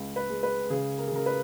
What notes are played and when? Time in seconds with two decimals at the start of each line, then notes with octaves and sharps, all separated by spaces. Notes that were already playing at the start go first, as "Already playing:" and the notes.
Already playing: C#2
0.16 B4
0.30 G#3
0.43 B4
0.70 C#3 G#4
0.98 A#4
1.07 G#4
1.12 C#3 A#4
1.26 B4